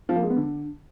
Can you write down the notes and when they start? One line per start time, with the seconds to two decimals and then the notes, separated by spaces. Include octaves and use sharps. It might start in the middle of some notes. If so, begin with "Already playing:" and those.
0.09 F3
0.16 A#3
0.23 G#3
0.30 B3
0.37 D3